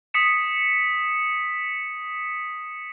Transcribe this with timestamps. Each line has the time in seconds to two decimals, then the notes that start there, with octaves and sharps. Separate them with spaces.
0.14 D#6 B6 C#7 E7